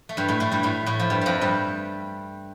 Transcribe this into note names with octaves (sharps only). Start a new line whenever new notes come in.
A3
G2 G3
A2 A3
A2 A3
G2 G3
A2 A3
A2 A3
F3
G2 G3
F2 F3 G3
G2 G3